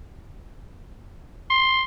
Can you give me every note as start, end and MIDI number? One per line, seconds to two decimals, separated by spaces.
1.50 1.83 84